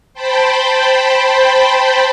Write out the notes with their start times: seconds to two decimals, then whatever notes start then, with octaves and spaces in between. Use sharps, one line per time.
0.14 C5 G5 A5 B5